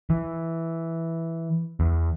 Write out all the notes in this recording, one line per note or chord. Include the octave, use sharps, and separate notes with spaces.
E3
E2